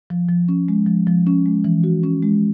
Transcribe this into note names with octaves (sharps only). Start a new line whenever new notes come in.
F3
F3
C#4
G#3
F3
F3
C#4
G#3
E3
F#4
C#4
G#3